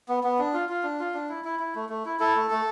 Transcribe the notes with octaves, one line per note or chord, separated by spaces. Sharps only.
B3
B3
D4
F4
F4
D4
F4
D4
E4
E4
E4
A3
A3
E4
E4 A4
A3
A3